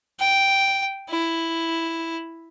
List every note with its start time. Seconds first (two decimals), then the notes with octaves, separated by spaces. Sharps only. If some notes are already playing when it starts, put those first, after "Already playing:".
0.20 G5
1.10 E4